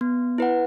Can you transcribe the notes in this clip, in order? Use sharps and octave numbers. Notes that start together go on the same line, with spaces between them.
B3
E4 B4 F#5